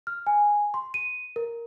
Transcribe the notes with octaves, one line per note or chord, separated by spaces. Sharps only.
F6
G#5
C6
D#7
A#4